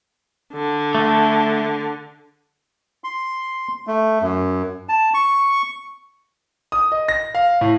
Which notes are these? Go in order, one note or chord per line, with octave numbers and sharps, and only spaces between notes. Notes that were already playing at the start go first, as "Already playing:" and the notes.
D3
A3
C6
A3
F#2
A5
C#6
D#6
D#5
A#6
F5
A2